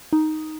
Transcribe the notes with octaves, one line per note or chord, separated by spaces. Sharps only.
D#4